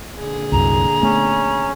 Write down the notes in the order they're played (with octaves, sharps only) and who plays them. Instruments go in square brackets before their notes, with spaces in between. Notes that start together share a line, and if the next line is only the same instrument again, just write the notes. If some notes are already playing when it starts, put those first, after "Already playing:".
[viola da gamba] A#2 D3 G#4
[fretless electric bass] C2 F#2 [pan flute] A#5
[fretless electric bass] A3 B3 [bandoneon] C#4